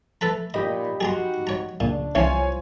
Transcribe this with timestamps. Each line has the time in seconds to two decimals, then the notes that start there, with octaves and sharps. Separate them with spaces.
0.21 A3 A4 B4 A#5
0.54 A#2 D#4 G4 D#5 B5
1.01 F#4 G#4 A#5 C6
1.47 C#5 A#5
1.80 C#2 A#2 D4
2.15 C2 E3 C#4 F4 C5 C#5 G#5